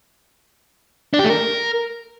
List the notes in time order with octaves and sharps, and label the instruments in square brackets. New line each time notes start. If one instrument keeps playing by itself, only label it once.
[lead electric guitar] D4
G4
A3
A#4